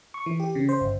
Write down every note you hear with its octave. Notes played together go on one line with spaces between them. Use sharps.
C#6
E3
G4
C#3
C5
G1